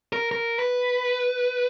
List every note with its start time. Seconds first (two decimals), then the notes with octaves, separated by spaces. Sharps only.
0.13 A#4
0.31 A#4
0.59 B4